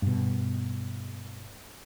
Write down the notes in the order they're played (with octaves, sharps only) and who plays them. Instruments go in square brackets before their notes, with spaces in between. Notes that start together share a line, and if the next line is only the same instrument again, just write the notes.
[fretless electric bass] G2 B2